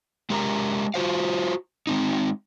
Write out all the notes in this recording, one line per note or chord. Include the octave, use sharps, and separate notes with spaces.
G#3 G4 A#4 A#5
F4 F#4 C5 F5
G#3 C4 D#4